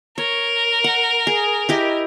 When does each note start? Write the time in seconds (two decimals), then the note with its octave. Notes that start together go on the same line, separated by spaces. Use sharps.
0.18 A#4 C#5
0.84 F#5
1.27 G#4
1.69 E4 G4 D#5